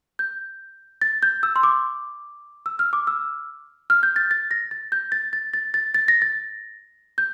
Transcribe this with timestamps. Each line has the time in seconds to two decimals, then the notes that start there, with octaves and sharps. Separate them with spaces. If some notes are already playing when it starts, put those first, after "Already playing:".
0.19 G6
1.02 A6
1.23 G6
1.43 E6
1.56 C6
1.63 D6
2.66 E6
2.79 F6
2.93 D6
3.07 E6
3.90 F6
4.03 G6
4.16 A6
4.31 A6
4.51 A#6
4.71 A6
4.92 G6
5.12 A6
5.33 A6
5.54 A6
5.74 A6
5.94 A6
6.08 A#6
6.22 A6
7.18 G6